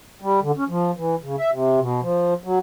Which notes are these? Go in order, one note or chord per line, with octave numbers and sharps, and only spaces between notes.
G3
D3
C#4
F3
E3
C#3
E5
C3
B2
F3
F#3